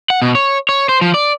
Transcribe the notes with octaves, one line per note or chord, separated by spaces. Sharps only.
F#5
B2
C#5
C#5
C5
F3
D5